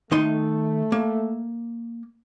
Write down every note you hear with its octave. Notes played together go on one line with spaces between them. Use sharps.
D#3 A3 D#4 C6
A#3